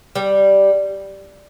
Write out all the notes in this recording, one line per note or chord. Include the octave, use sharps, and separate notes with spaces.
G3